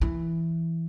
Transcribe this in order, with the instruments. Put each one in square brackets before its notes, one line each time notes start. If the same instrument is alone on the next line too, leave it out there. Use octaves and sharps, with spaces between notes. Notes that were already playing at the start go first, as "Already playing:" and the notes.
[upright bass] E3